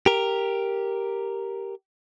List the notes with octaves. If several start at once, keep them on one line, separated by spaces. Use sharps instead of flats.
G4 A#4